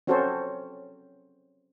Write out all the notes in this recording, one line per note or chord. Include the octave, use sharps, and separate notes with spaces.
C4 C#4 F#4 A4 C5 C#5